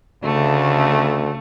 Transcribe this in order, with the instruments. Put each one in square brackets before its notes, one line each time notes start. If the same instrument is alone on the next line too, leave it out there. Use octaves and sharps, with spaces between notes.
[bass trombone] D2 [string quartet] C#3 A3